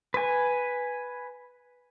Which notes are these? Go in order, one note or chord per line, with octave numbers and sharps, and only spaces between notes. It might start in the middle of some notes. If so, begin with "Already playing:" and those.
B4 G#5